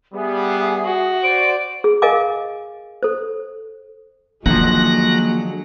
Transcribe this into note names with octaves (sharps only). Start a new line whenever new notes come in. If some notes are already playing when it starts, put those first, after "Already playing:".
G3 B3 G#4 E5
F#4
C5 D5 D7
G#4
A#4 D#5 F5 G#5 D6
A4 C5
D3 D#3 F3 F#3 G#3 A#3 F#6 A#6